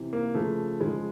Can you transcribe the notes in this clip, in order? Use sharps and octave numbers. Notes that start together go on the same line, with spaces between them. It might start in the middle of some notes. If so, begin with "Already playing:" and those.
Already playing: C3 E3
A#3
C#3 F3 A3
C#3 F3 G#3